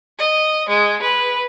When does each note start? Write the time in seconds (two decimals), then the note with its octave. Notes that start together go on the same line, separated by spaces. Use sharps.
0.18 D#5
0.69 G#3
1.02 B4